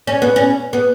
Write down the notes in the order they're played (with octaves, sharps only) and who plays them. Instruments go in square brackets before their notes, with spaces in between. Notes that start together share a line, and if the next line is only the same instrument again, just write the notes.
[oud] C#4
B3
C#4
B3